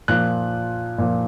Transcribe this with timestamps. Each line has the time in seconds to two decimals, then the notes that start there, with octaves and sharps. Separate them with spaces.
0.08 A#2 F3 F#6
0.98 A#2 F3